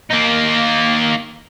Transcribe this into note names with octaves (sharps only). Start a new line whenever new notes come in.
A#3 D#4